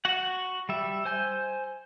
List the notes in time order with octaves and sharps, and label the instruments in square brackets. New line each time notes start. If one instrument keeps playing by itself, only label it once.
[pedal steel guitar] F#4 F#5
G3 E5
C5 G#5 G6